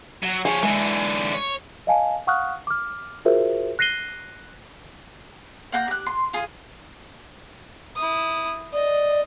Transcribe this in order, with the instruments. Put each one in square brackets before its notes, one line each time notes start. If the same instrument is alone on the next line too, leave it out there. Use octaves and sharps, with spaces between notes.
[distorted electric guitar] F#3
[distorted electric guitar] F3 C#5 [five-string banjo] G#4
[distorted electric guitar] D3 E3 [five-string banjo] G#3
[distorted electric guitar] C#5
[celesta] D#5 F5 G#5 A5
F5 F#5 C#6 D#6 F6 F#6
D6 F6
F4 F#4 G#4 A#4 C5 E5
F#6 A#6 C7 D#7 G7
[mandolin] A#3 F#5 A#5 G6
G4 F#6
C6
F4 G#4
[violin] E4 D#6
[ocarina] D5 [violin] D#5